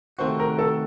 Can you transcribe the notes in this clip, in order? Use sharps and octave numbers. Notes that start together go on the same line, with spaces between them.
C3 D#3 A3 C4 F#4 C5
A#4
A4